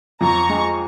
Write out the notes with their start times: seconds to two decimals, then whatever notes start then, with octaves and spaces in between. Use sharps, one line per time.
0.21 F2 A#5 C#6
0.50 G#3